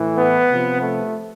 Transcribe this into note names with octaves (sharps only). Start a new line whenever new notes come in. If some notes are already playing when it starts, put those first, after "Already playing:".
Already playing: A2 E3
B3
C3 F3
A3